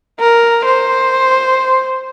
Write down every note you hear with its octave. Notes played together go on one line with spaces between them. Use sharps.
A#4
C5